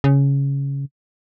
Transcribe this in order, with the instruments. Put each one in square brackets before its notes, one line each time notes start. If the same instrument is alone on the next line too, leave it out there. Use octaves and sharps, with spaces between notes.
[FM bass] C#3